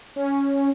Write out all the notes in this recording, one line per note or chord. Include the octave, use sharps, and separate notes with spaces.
C#4